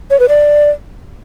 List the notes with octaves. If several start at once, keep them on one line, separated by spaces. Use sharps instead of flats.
C#5
B4
D5